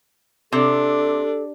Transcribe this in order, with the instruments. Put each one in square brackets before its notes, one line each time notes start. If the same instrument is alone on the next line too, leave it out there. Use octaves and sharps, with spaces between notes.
[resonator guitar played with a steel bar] C3 [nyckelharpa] D4 [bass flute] A4